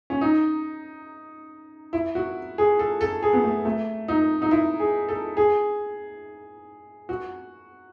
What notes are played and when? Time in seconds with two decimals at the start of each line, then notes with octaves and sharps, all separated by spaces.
0.10 C#4
0.21 D#4
1.93 E4
2.15 F#4
2.58 G#4
2.79 A4
3.01 A4
3.23 G#4
3.33 B3
3.43 A3
3.65 A3
4.08 D#4
4.42 D#4
4.51 E4
4.80 G#4
5.09 A4
5.37 G#4
7.09 F#4